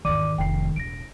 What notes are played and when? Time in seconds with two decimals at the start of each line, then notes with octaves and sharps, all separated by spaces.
0.05 G#1 E2 D#3 D5 D6 D#7
0.38 F1 G5 C7
0.76 E1 A2 A#6 D7